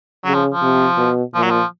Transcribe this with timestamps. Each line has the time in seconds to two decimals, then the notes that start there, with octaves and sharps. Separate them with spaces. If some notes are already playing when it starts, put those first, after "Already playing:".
0.24 C#3 F#3
0.34 F3
0.53 F3
0.62 C3
0.97 B2
1.34 A#2 F3
1.42 F#3
1.50 F3